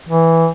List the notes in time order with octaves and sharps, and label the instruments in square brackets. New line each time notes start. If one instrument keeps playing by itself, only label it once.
[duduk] E3